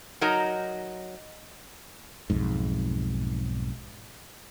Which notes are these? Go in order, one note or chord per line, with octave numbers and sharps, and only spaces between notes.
F#3 D#4 A#4 D#5 A#5
B1 F2 G#2